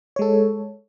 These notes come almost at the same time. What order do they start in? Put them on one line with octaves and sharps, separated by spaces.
C#5 G#3 A4